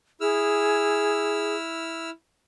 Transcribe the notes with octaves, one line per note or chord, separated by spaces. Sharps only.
E4 G#4 E6 F6